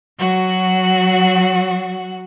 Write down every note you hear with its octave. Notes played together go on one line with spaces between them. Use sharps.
F#3 F#4